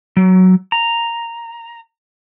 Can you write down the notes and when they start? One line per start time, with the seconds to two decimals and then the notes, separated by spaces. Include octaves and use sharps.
0.17 F#3
0.72 A#5